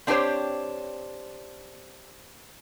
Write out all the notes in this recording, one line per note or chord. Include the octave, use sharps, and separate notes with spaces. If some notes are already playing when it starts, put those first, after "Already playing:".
C4 D4 G4 G#4 C5 C#5